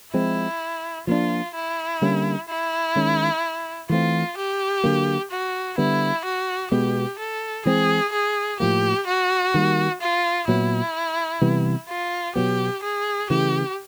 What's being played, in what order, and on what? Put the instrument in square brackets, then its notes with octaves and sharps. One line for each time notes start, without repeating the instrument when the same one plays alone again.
[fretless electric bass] F3 G#3 C4 [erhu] E4
[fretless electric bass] F3 A#3 D4 [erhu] F4
[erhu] E4
[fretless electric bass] D3 G3 A#3 C#4
[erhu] E4
[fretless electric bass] D#3 G#3 C#4
[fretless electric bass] E3 A3 C4 [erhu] F4
[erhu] G4
[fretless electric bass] D3 F#3 A#3
[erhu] F#4
[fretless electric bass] D3 G3 B3 [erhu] E4
[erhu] F#4
[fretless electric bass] B2 G#3 B3 [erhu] G4
[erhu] A4
[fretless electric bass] E3 G#3 C4 [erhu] G#4
[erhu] G#4
[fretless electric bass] A2 F3 A#3 [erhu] G4
[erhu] F#4
[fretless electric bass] D#3 G3 A#3
[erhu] F4
[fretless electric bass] A#2 F#3 B3 [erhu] E4
[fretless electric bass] C3 E3 G3 B3
[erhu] F4
[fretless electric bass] B2 F#3 B3 [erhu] G4
[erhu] G#4
[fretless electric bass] C#3 E3 A3 [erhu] G4